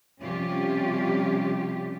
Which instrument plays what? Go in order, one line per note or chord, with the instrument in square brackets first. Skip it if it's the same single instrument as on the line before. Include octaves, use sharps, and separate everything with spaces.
[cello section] C3 F3 G3 C#4 F4 G4